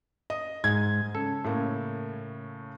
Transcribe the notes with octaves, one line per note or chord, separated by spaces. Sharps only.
D#5
G#2 G#6
C#3 A4
A2 C#3 A#3